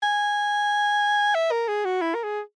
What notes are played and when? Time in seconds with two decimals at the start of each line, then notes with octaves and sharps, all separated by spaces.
0.03 G#5
1.34 E5
1.51 A#4
1.68 G#4
1.85 F#4
2.02 E4
2.15 A#4
2.23 G#4